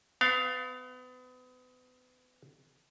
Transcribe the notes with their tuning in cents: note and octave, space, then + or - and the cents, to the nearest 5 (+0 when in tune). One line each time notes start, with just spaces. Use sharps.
B3 +35 F5 +0